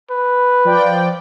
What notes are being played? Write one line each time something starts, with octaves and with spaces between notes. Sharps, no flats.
B4
F3 D5 G5